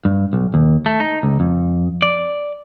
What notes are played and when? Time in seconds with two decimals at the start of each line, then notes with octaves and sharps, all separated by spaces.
0.05 G2
0.33 B1
0.54 D#2
0.86 A3
1.00 D#4
1.23 C#2
1.40 F2
2.02 D5